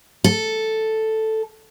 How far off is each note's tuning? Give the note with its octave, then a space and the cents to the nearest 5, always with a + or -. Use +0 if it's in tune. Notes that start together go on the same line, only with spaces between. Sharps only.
A4 +0